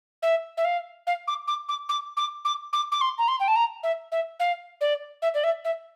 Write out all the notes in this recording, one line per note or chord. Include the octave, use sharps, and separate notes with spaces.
E5
E5
F5
F5
D6
D6
D6
D6
D6
D6
D6
D6
C6
A#5
C6
G5
A5
A#5
E5
E5
F5
D5
E5
D5
E5
E5